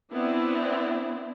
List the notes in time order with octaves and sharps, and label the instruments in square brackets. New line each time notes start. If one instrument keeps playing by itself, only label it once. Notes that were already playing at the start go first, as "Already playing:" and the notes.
[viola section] B3 C4 D4 E4